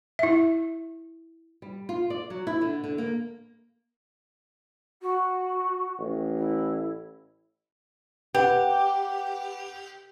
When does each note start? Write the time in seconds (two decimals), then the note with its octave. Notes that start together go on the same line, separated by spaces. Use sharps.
0.19 E4 E5
1.62 G3
1.89 F4
2.10 D5
2.30 F#3
2.47 E4
2.61 D3
2.84 D3
2.98 A#3
5.01 F#4
5.99 A1
6.38 E4
8.34 G4 B4 F#5